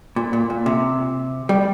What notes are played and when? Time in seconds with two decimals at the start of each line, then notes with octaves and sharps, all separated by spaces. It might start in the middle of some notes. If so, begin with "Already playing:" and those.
0.16 A#2
0.33 A#2
0.50 A#2
0.66 C3
1.49 G3